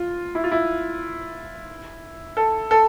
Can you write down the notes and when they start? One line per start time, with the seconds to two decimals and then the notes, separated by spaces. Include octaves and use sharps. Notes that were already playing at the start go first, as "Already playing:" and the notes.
Already playing: F4
0.35 E4
0.44 F4
0.52 E4
2.37 A4
2.71 A4